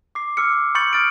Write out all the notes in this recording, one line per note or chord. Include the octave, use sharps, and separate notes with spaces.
D6 C7
D6 E6 F6 C#7
B5 C#6 G6 A6 C#7 F#7
D#6 F6 A6 C#7 D7